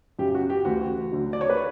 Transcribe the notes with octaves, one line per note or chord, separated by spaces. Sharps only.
F#2 C#3 F#3 G4
F#4
G4
D2 C#3 E3 F#4
D2 D3 F#3
D5
C#5
B4